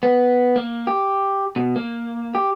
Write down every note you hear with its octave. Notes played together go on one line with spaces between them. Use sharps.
B3
A#3
G4
B2
A#3
G4